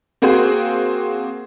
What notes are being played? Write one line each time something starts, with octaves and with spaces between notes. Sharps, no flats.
A#3 C4 F#4 G#4 C5